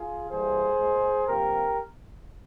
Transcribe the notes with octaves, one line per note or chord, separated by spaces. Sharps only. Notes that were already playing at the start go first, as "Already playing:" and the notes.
Already playing: F4 G#4
E3 G3 A#3 G#4 C5
A#2 G#3
C3 F3 A#3 G4 A#4